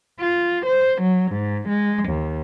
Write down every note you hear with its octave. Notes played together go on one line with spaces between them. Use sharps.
F4
C5
F#3
G#2
G#3
D#2